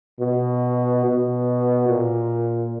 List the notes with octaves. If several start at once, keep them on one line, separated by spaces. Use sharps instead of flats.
B2
B2
A#2